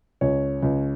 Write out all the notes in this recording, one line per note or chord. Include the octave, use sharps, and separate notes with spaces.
C#2 C#5
C#2